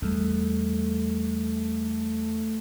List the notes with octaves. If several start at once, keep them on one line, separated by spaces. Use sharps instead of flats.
E2 G3 A3